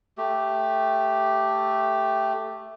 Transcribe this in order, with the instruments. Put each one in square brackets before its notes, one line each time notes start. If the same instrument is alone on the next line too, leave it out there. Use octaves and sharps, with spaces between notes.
[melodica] A3 G4